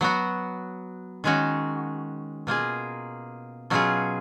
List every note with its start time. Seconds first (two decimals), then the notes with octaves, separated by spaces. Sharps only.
0.01 F#3 B3 F#4
1.24 D#3 G#3 C#4 F#4
2.47 B2 A#3 F4 G#4
3.70 B2 F#3 C#4 F4 G#4